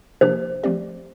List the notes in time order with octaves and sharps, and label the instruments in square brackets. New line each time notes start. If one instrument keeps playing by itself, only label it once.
[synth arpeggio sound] C3 F3 A#3 D4 G4 [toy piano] C5
[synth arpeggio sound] F3 A3 C4 G4 D5